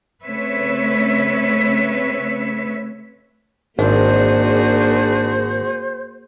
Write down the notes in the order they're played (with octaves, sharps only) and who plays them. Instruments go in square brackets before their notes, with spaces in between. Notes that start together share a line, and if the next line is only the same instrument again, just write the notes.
[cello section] C#3 A3 C4 B4 C#5 E5
[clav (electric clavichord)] G#1 [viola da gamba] A#3 F#4 G#4 [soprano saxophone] D4 [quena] C5